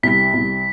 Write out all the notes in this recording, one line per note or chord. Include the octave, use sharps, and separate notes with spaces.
C2 B6
C2